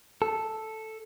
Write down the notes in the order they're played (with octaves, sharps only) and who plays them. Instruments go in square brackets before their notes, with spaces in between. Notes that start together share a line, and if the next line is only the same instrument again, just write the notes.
[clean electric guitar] A4